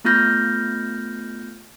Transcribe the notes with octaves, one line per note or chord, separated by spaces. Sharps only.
A3 B3 F4 F6 G6 A#6